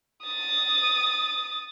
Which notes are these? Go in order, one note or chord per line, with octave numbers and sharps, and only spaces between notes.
D#6 A6